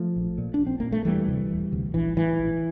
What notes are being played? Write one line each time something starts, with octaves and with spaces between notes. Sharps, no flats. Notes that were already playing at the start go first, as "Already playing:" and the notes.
Already playing: F3 A3
A#1
A#2
D4
A#1
C4
A#2 A#3
A3
E1 E3 G3
D2 C3
E1
D2 C3
A#1 E3
A2 E3
A#1